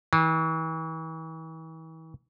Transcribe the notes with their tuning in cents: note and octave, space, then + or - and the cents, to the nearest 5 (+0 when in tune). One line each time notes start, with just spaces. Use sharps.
E3 -40